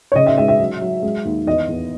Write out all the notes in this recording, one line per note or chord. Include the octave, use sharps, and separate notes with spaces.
C#5
C#3 D#5
E5
G#3 E5
E5
F#3
F#3
G#3
D#2
E2 D#5
E2